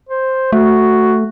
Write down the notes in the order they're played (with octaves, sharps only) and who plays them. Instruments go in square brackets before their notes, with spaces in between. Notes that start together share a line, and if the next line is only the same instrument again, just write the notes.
[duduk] C5
[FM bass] A3 [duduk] F#4